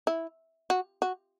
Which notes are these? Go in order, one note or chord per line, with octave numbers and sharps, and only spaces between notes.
E4
F#4
F#4